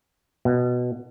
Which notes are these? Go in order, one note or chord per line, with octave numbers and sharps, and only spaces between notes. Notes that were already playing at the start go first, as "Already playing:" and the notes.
B2